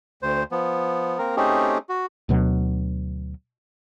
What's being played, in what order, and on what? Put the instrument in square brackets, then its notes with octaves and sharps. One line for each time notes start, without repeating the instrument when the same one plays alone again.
[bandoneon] D2 C5
F3 B3
A#3 C4 A#4
A3 C4 C#4 D#4 G4 G#4
F#4
[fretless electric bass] D2 B2 F#3